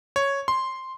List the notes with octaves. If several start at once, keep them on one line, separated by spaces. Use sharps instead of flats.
C#5
C6